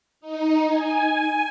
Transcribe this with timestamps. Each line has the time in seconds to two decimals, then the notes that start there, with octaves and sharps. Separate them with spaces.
0.21 D#4
0.68 G#5